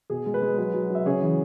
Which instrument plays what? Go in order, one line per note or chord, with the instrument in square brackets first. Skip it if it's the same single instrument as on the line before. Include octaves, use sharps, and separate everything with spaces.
[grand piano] B2 G#4
G#3
B4
G#3
F#3 B4
F#3
F#3 E5
C#3 G#4 C#5
E3